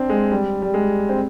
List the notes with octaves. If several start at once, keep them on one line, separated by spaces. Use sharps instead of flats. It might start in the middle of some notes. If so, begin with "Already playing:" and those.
Already playing: C4 D4
G#3
G3
G3
G#3
C4